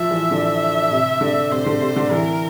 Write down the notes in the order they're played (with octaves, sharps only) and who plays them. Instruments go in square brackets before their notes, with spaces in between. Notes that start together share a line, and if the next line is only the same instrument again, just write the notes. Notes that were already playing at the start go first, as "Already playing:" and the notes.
Already playing: [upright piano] F3 [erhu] E5
[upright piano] E3
D3
C3
D3
[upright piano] C3 [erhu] C5
[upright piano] D3
C3
D3
[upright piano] E3 [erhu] A#4